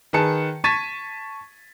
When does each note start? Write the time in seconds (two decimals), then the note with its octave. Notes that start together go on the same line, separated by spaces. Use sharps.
0.13 D#3 G#4 B4 A5 C#7
0.64 A5 C#6 G#6 A6 B6 D#7